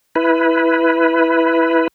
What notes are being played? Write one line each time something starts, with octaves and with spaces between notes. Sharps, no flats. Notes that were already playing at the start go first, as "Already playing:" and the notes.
E4 B4